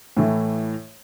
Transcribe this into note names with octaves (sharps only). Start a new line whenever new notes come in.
A2 E3 A3